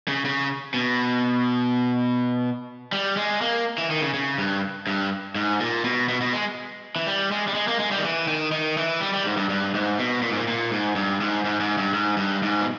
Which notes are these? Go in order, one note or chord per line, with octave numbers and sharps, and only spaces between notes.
C#3
C#3
B2
G3
G#3
A#3
E3
D#3
C#3
C#3
G2
G2
G#2
A#2
B2
B2
B2
G#3
E3
G3
G#3
G3
G#3
A#3
G#3
G3
D#3
E3
D#3
D#3
E3
G3
G3
G#2
G2
G2
G#2
B2
A#2
G#2
A#2
A#2
G#2
G2
G#2
G#2
G#2
G2
G#2
G2
G#2
B2